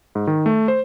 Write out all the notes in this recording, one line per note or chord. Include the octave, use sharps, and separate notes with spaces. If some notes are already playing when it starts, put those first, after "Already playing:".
G#2
D#3
A3
C5